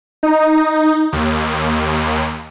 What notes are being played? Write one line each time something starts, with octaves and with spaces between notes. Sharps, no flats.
D#4
D#2